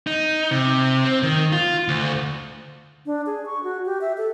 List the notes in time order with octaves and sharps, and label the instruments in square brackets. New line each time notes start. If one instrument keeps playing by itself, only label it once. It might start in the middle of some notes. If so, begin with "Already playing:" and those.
[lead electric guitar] D#4
C3
C4
D#3
F4
D2
[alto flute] D4
G#4
C#6
F#4
G4
E5
A4